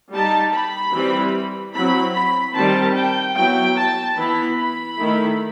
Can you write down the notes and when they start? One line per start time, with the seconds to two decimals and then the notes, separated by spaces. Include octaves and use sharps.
0.12 G3 D#4 A5
0.53 B5
0.93 E3 G3 C4 E4
1.74 F#3 C4 E4 B5
2.15 B5
2.55 D#3 G3 C4 A5
2.96 G5
3.36 F#3 B3 E4 G5
3.76 A5
4.17 E3 B3 E4 B5
4.58 B5
4.98 D#3 A3 E4